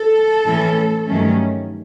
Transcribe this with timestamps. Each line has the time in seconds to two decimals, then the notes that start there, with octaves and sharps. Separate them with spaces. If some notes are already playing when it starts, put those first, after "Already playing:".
Already playing: A4
0.45 A2 E3 A3 C#4
1.07 G2 D#3 F#3 A3 C#4